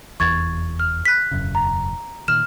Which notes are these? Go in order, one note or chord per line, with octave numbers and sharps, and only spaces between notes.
F1 E2 E3 C#6 G#6 A6
F6
F#6 B6
E1 F#2 C#3
A#5
A#2 D#3 F6 E7